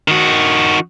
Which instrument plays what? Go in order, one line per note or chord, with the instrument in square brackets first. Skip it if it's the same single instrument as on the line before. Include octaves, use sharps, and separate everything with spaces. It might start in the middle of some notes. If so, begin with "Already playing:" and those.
[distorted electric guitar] D#3 F#4